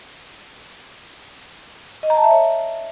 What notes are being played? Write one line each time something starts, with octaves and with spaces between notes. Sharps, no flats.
D#5
A#5
A5
E5
C#5